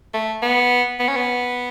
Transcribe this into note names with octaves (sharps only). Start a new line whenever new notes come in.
A3
B3
B3
C#4
B3